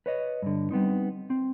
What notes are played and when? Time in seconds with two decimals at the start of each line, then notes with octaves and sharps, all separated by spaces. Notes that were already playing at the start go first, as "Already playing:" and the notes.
0.06 B4 C#5 D#5
0.42 G2 D3
0.71 G3 B3 C4 D#4
1.30 C4